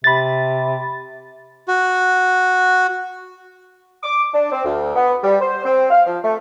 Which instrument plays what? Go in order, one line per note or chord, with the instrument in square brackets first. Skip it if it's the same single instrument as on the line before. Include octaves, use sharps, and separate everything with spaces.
[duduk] C3 [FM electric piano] B5 A6
[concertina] F#4
[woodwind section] D6
D4
C4
D2
B3
G3
C5
C4
F5
F3
A3